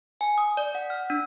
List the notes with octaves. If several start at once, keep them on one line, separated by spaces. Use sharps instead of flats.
G#5
D#6
D5
F#5
F6
D4